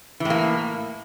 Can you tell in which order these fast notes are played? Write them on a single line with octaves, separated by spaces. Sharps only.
E3 A2 A#3